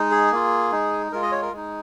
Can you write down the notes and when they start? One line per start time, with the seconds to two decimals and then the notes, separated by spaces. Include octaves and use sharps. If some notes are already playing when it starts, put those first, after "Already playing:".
Already playing: G#3 D#4
0.11 G#4
0.31 A#3 F4
0.72 G#3 D#4
1.12 G#3 F4 A#4
1.22 D#5
1.32 C#5
1.42 A#4
1.53 G#3 D#4